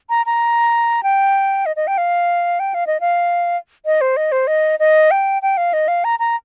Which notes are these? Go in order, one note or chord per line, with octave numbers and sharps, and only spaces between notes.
A#5
A#5
G5
D#5
D#5
G5
F5
G5
F5
D#5
F5
D#5
C5
D#5
C5
D#5
D#5
G5
G5
F5
D#5
F5
A#5
A#5